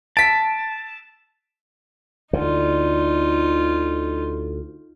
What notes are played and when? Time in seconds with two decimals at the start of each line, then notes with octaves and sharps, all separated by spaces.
0.17 A5 B6 D7
2.33 D2 D3 D#4 F4